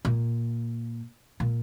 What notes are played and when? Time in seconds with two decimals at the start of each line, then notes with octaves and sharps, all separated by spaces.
0.05 A#2
1.40 A#2